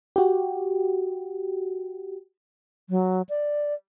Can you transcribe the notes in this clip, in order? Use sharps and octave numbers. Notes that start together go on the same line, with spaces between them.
F#4 G4
F#3
D5